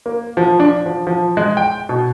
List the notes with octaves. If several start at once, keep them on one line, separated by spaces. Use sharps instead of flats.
A#3
F3
D4
F3
F3
G#3
G5
B2